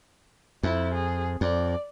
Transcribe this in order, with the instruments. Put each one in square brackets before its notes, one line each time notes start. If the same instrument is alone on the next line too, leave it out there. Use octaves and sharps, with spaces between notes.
[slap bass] F2 [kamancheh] E4
[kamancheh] G#4
[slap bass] F2 [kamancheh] D5